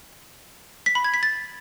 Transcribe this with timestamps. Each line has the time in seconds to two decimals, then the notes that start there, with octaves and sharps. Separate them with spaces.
0.86 B6
0.95 B5
1.04 G#6
1.14 B6
1.23 A6